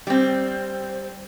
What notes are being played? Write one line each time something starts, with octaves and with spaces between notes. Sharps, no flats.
G3 C4